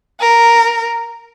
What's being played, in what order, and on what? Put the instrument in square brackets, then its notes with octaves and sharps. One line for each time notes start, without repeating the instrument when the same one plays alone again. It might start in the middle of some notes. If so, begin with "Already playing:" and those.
[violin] A#4